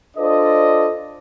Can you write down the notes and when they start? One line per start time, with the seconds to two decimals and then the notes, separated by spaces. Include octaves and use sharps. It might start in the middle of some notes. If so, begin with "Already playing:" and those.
0.17 D4 F4 A4 C5 D5 D#5